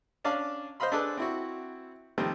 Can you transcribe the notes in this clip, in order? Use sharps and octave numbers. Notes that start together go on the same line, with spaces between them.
C#4 D4 D5 F5 A5
C5 D#5 F5 B5 C6
D4 G#4 A4 B4 D5 A5
C4 E4 F#4
D#3 F3 G3 A3 C4